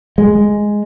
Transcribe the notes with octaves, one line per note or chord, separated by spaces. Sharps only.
G#3